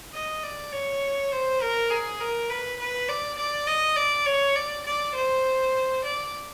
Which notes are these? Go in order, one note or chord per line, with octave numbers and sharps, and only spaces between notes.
D#5
D5
C#5
C5
A#4
G#4
A#4
B4
B4
D5
D5
D#5
D5
C#5
D5
D5
C5
D5